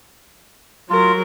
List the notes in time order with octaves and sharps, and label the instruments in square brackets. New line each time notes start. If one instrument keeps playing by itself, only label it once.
[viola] F#3 A#4 [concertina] F4